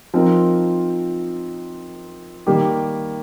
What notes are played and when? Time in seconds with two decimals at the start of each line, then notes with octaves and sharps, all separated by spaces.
0.14 F3 C4 D#4 A#4
2.47 D#3 G3 A#3 G4